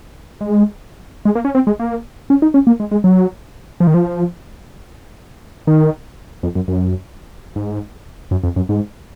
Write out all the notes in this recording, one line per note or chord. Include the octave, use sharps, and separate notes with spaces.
G#3
G#3
A#3
C#4
C4
G#3
A#3
C#4
D#4
C#4
A#3
G#3
G#3
F#3
F3
D#3
F3
D#3
F2
F#2
F#2
G#2
F#2
F2
F#2
G#2